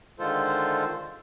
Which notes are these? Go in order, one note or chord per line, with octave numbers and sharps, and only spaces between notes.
D3 D#3 G#3 F4 A4 C5